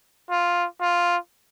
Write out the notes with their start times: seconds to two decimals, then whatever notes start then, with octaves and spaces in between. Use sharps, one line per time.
0.30 F4
0.81 F4